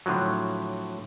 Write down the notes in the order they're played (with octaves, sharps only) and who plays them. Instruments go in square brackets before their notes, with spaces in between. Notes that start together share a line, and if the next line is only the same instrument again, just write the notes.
[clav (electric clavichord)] A2 D3 F3 F#3